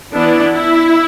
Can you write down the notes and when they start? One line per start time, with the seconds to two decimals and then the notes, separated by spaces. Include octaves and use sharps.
0.12 E3 B3 D4 E4
0.55 E4